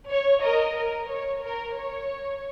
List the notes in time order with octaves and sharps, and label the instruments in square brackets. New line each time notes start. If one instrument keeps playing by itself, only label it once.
[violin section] C#5
A#4 D#5
A#4
C#5
A#4
C#5